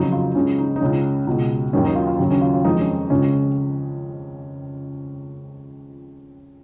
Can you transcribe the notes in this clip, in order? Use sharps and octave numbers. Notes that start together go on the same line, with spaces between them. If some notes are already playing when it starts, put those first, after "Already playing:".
Already playing: F2 C#3 F#3 D#4
F4
C#2 C#3 G#3 C#4
D#4
D#4
C#2 C#3 G#3 C#4
C#2 B2 G#3
D#2 D#3 F#3 C#4
D#4
F4
F4
D#2 C#3 F#3
C#4
F4
F4
F2 D#3 G#3 D#4
C#4
C#2 C#3 G#3 C#4